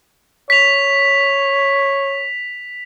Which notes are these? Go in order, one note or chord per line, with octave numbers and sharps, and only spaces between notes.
C#5 B6 F7